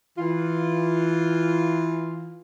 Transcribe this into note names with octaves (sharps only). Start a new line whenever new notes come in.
E3 F4